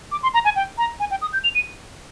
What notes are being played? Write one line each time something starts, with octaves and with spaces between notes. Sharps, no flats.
D6
C6
A#5
G#5
G5
A#5
G#5
G5
D#6
G6
F7
D#7